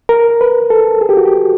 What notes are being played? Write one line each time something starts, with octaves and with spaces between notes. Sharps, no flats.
A#4
B4
A4
G#4
G4
F#4
G4